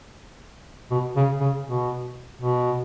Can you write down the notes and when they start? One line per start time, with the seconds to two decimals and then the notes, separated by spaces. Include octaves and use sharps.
0.91 B2
1.16 C#3
1.40 C#3
1.66 B2
2.41 B2